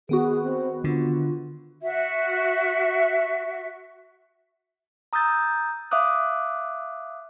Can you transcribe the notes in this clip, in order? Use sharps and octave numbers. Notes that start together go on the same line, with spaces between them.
D#3 B3 F#4 G#4
C4
D3 F4
F#4 E5
A#5 D#6 E6 G6 A6
E5 F5 D6 D#6 F#6